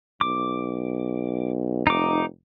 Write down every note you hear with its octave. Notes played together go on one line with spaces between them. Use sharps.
B1 D6
F1 D#4 D6